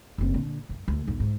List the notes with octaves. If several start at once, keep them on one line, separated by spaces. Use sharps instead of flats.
F#1 C4
A#2 D3
F#2
D2
B1 E2
G#2